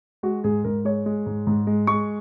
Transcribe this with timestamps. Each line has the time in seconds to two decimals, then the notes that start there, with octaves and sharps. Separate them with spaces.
0.23 G#3 F#4
0.44 G#2 G#4
0.64 G#2 A#4
0.85 G#3 C#5
1.06 G#3
1.26 G#2
1.47 G#2
1.67 G#3
1.87 G#3 C#6